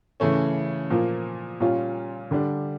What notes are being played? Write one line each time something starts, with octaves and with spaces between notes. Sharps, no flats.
C#3 E3 A3 C#4
A#2 F3 A#3
A#2 G3 C#4 F4
D3 G3 D4